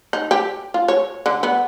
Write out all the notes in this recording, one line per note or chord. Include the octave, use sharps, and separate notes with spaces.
D#4
G4
F4
C#5
D3
B3